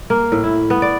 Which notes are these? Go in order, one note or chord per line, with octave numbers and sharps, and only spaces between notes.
A#3
A2
E4
B3
D5